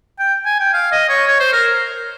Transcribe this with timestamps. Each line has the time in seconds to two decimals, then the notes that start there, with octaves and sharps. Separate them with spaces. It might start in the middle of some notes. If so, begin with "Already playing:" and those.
0.19 G5
0.46 G#5
0.60 G5
0.74 F5
0.92 D#5
1.09 C#5
1.28 C#5
1.40 C5
1.53 A#4